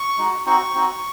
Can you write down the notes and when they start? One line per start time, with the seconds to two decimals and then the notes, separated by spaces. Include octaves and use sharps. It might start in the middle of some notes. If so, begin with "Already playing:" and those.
Already playing: C#6
0.18 G#3 D#4 F#4
0.46 C4 D#4 F#4 C#6
0.74 C4 D#4 F#4